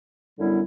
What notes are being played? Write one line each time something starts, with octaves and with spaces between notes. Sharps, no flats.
F#2 D3 G3 B3 E4